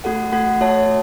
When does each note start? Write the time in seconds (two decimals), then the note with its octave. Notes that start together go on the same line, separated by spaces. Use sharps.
0.04 A3 F#4 A4 F#5
0.32 A3 F#4 A4 F#5
0.61 A3 F#4 C#5 E5 A5